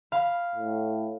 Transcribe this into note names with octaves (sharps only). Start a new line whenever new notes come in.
F5 B5
A2